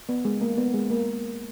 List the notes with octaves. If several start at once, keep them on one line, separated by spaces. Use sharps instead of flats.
B3
G#3
A#3
B3
G#3
A#3